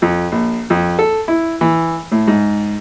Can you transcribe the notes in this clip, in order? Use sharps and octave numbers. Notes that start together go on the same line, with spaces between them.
F2
A#1
F2
A4
E4
E3
A2
G#2